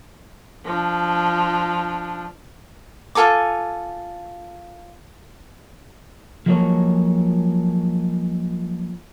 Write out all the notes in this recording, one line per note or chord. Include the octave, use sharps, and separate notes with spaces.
F3 D4
F4 A4 G#5 D6
F3 F#3 G#3 A#3 A4 C#5